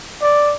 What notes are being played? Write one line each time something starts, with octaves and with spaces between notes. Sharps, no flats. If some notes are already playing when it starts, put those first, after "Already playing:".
D5